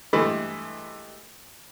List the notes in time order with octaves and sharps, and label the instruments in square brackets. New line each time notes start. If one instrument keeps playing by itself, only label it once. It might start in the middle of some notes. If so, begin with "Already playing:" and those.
[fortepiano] G2 E3 G#3 A3 B5